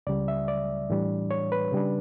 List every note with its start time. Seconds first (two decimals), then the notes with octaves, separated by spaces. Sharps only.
0.07 C#2 C#3 G3 D5
0.28 E5
0.48 D5
0.90 A2 E3 G3 D4
1.31 C#5
1.52 B4
1.72 C#3 G3 D4